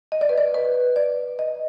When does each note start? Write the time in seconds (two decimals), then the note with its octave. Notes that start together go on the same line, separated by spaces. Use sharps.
0.12 D#5
0.21 D5
0.29 B4
0.38 D5
0.54 B4
0.96 D5
1.39 D#5